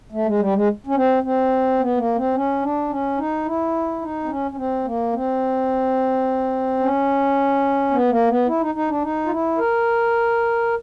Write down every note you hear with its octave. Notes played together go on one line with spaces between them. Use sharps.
A3
G#3
G3
G#3
C#4
C4
C4
B3
A#3
C4
C#4
D4
C#4
D#4
E4
D#4
C4
C#4
C#4
C4
A#3
C4
C#4
B3
A#3
B3
E4
D#4
D#4
D4
D#4
F4
E4
A#4